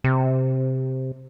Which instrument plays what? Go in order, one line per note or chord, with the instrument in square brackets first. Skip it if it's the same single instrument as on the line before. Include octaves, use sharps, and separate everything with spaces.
[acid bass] C3